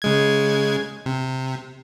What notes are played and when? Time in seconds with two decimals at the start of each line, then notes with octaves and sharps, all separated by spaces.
0.02 C#3 G#3 G#6
1.06 C3